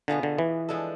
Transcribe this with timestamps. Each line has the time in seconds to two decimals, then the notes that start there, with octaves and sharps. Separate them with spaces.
0.08 B2 D3 B3 F4 G#4
0.23 D3
0.38 E3
0.69 F3 G#3 D4 A4